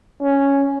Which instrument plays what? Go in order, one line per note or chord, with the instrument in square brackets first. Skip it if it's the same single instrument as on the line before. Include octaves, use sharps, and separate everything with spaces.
[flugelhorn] C#4